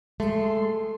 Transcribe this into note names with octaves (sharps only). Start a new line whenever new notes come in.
G#3 A3 C6